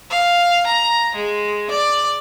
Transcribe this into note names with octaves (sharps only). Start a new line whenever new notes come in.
F5
A#5
G#3
D5